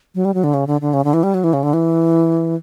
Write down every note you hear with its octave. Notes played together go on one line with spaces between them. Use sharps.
F#3
G3
F#3
D3
C#3
D3
D3
C#3
D3
E3
G3
F#3
E3
C#3
D3
E3